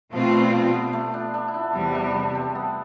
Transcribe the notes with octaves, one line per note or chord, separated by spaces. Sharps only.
B2 F3 A3 C4 F4
G3
F3
B3
A3
D4
D4
E4
D4
E2 C3 G3 E4
D4
D4
C4
B3